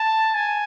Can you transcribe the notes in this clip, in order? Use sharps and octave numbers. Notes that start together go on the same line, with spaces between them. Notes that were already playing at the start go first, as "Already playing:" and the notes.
Already playing: A5
G#5